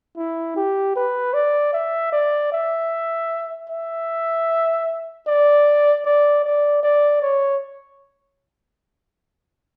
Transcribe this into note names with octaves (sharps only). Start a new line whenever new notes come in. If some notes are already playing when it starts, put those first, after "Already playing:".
E4
G4
B4
D5
E5
D5
E5
E5
D5
D5
D5
D5
C#5